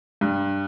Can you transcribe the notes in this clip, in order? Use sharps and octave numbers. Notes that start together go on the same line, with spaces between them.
G2